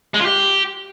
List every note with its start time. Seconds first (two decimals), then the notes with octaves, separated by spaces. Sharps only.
0.14 G#3
0.20 F4
0.25 G4